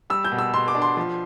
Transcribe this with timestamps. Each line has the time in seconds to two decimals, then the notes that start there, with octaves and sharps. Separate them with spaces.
0.10 G3 E6
0.25 G6
0.32 B2
0.39 E6
0.53 B2 C6
0.68 D6
0.75 D4
0.82 C6
0.97 F3